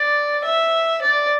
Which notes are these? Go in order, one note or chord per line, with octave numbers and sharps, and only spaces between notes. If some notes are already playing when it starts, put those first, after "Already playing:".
Already playing: D5
E5
D5